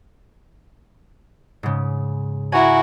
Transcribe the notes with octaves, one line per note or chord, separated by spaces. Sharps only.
G#2 C#3
E4 F#4 G#5 A#5